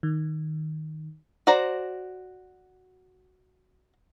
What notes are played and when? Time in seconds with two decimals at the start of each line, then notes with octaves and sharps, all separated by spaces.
0.03 D#3
1.47 F#4 C5 D5 A#5